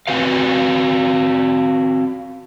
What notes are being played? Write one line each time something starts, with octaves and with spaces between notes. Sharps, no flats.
C4 F#4 B4 F5